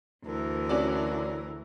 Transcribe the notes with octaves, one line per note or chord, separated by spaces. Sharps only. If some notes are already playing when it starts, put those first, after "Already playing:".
D2 E3 A#4
C#4 F#4 D5